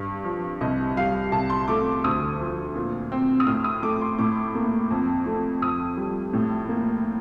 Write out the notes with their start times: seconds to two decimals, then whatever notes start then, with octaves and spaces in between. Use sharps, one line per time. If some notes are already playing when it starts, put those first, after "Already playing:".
Already playing: G2
0.24 F3
0.61 C2 D#5
0.97 G3 F5
1.32 C2 A5
1.50 C6
1.68 A3 D6
2.04 D2 D#6
2.40 F3
2.76 A#2
3.12 C4
3.40 D#6
3.47 A2 F6
3.64 D#6
3.83 A3 D6
4.01 C6
4.19 A2 D6
4.55 A#3
4.90 F2
5.26 A3
5.62 F2 D#6
5.97 G3
6.34 A2
6.69 A#3